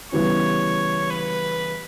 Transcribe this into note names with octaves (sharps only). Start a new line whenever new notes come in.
C#3 E3 G3 B3 C#5
B4